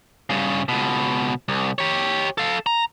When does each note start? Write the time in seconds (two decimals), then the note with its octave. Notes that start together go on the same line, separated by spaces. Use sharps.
0.30 G2 C#3
0.69 C#2 B2
1.48 C2
1.78 G4 C#5
2.38 A4 F5
2.66 A#5